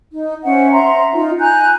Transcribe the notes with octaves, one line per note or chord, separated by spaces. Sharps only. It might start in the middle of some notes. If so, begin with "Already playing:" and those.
D#4
C#4 C5 E5 F#5
E5 A#5 C6
D#4 F4
G#5 A#5 F#6 G6